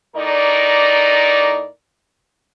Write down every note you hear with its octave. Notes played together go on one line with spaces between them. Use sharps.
A2 D#4 A#4 D5